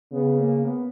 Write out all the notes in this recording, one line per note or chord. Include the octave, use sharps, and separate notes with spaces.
C#3 B3
A#3
B3